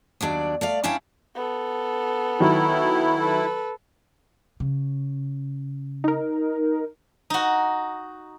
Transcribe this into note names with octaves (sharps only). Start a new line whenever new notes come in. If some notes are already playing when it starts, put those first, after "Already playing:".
D#2 F#3 D4 D5
A3 D5 F5
C#4 D4 E4 C#5 F5 G5
B3 A4
D#3 F#3 E4
A4 B4
C#3
D#4 A#4
D#4 F#4